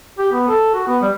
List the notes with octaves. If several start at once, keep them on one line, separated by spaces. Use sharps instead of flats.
G4
B3
A4
F#4
B3
G3